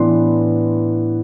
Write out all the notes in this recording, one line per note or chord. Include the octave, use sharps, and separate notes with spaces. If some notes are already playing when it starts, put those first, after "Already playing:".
Already playing: A2 E3 B3 D4 C6